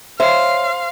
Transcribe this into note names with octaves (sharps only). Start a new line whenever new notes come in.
C5 C#5 E5 F5